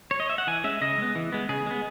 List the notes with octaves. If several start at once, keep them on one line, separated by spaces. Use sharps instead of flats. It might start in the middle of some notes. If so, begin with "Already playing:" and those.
C#5
D#5
E5
F#5
E3 G#5
G#3 C#4 E5
C#3 D#5
G#3 B3
E3
G#3 B3
C#3 G#4
G#3 B3